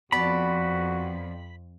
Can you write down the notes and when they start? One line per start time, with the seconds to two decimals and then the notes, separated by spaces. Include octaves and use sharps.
0.12 F2 B3 F#4 D5 A5 B5